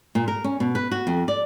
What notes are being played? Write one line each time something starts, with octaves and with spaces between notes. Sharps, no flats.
A#2
A#4
C#4
B2
B4
F#4
F2
D5